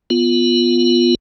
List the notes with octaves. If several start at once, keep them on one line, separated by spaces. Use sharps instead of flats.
B3 F4